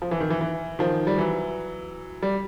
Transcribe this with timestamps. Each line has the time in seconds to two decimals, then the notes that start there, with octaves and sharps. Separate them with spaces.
0.02 F3
0.11 E3
0.20 D#3
0.30 E3
0.41 E3
0.79 D#3 F3
1.07 G3
1.18 E3 F#3
2.23 G3